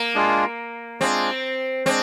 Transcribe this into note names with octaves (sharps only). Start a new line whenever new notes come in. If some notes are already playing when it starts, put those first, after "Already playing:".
Already playing: A#3
G#3 D4 F4 G#4
G#3 C4 D4 F4 G#4
G#3 C4 D4